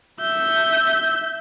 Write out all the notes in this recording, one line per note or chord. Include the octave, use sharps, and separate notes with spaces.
E5 G6